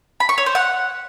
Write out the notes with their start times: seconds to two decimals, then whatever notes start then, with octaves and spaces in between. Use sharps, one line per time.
0.20 B5
0.29 C#6
0.38 C#5
0.46 C5
0.55 F#5